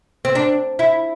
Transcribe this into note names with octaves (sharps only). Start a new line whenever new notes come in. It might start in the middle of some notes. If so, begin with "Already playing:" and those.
C4
D4
E4